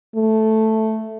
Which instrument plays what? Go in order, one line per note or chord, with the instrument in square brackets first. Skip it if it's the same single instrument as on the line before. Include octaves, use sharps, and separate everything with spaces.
[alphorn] A3